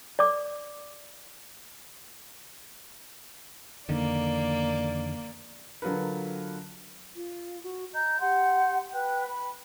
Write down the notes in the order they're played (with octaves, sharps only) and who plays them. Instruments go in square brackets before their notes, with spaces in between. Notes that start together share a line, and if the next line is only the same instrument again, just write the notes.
[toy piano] D5 D6
[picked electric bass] F2 D3 D#3 [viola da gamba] A#3 D5
[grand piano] D3 F#3 F4 A#4 B4
[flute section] F4
F#4
D#5 A#5 G6
G4 F#5 C6 G6
B4 G5 F#6
B5